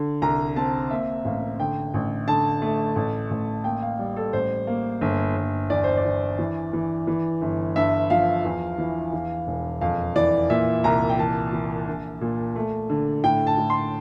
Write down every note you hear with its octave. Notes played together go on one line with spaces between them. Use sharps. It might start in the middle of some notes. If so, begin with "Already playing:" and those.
Already playing: D3
C2 A#5
C4 A5
A#3 E5
A1 F5
D3 G5
A1
D3 A5
A3
A1
A1
A#3 G5
F5
G3
A4
A1 C5
A#3
G1
G1
E2 D5
C5
D5
E2
E3
E3
E3
G1
G2 E5
F3 F5
E2
E3
E2
E1
F2 F5
E3 D5
A#2 E5
C2 A#5
G5
E3 A5
E3
A#1
A#2
A3
D3
A2 G5
A5
A2
C6